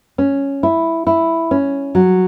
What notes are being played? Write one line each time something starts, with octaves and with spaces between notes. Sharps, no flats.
C#4
E4
E4
C#4
F#3